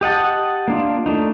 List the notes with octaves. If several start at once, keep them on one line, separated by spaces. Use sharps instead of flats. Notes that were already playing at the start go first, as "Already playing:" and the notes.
G4 D#5 F#5 A5
A#3 D4 F4
A3 D4 D#4